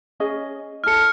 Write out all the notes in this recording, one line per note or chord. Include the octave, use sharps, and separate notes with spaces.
C#4 G#4 D#5
E4 A4 F6 C#7